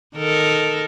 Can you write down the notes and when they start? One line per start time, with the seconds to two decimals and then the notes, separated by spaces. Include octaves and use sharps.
0.16 D#3 A4 A#4